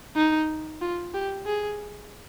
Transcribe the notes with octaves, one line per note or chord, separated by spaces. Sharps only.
D#4
F4
G4
G#4